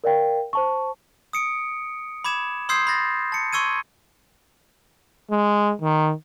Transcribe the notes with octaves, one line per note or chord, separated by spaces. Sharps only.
A#4 D5 F5 G5
C5 A5 C#6
D#6 C#7 D7
B5 D6 G#6 E7
C6 D#6 E6 G6 G#6 C7
B5 F#6 A6 A#6
A5 C#7
C6 C#6 E6 G#6 D#7
G#3
D#3